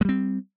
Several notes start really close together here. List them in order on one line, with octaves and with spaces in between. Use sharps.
G#3 G3 C4